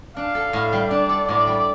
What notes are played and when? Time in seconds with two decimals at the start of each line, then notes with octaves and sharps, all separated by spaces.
0.17 D4 F5
0.35 A4
0.53 A2
0.73 G3
0.90 D4 D5
1.09 A4
1.28 A2 D5
1.47 G3